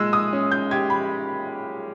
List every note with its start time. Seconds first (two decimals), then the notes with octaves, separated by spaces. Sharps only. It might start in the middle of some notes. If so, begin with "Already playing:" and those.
Already playing: A#2 G#3 E6
0.13 D#6
0.33 C#4
0.52 G6
0.71 G4 G#6
0.90 B5